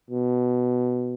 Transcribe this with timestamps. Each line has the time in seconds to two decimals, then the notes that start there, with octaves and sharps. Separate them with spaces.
0.10 B2